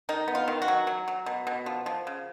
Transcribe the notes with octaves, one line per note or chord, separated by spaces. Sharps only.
D#3 D#4
B3
F4
D#3
F#4
F#3
F#3
F#3
B2
B2
F3
F3
C#3